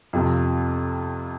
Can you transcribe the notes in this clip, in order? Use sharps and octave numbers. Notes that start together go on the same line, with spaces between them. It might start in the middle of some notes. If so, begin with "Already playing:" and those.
F2 C3 F3